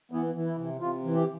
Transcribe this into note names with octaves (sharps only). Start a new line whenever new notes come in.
E3 B3
E3
E4
C3
C3 F4
E3
G4